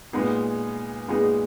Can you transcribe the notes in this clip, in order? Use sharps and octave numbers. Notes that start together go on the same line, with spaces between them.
A#2 G#3 B3 D#4 G#4
A#2 G#3 B3 D#4 G#4